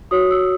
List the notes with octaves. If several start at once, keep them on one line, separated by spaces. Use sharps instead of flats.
F#4 C#5 D#6
E6